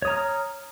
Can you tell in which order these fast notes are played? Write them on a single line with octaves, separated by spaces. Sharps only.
C#5 D#6 A#5 F6